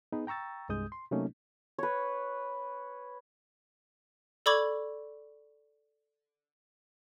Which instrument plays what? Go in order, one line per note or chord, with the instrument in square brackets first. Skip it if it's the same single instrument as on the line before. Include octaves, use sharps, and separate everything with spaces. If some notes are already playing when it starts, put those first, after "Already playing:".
[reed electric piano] B3 D#4 G#4 B4
G5 A#5 C#6 E6 A6
C2 G2 G#3 D#6 G6
C6
C3 F#3 A3 A#3 C#4 D#4
[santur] B4 C#5
[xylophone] A4 D5 B5 C#6 D6 G#6